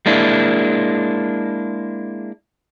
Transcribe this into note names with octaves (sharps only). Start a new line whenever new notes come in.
G#3 A#3 D4 E4